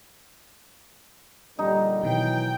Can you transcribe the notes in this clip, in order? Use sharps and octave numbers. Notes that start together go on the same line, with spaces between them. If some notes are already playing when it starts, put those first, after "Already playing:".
A#1 D3 G3 D#4
B2 D#3 E3 F#3 G5